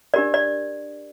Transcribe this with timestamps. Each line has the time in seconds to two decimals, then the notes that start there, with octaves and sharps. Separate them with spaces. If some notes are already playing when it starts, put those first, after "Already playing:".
0.14 D4 G4 A#4 D5
0.34 D5